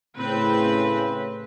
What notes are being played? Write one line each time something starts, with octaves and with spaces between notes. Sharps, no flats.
A2 C#3 C4 B4